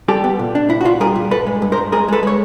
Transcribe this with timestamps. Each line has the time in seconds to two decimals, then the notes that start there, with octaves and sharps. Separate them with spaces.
0.08 G3 G4 A4
0.24 B3
0.39 A#2
0.55 D4
0.70 A#2 E4
0.81 F#4
0.85 A#2 F4
1.00 G3 G#4 A#4
1.16 A#2
1.31 G2 A4 B4
1.46 G#3
1.62 G2
1.72 A#4 C5
1.77 G2
1.92 G#3 G#4 A#4
2.08 G#3 A4 B4
2.23 G#3 C#5